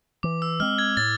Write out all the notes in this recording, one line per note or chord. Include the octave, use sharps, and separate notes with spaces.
E3 D6
E6
G#3 C4 F6
G#6
A2 A6